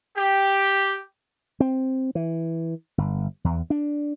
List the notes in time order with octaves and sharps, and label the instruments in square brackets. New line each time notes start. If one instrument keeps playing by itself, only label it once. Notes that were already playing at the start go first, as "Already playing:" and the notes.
[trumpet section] G4
[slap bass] C4
E3
G1
E2
D4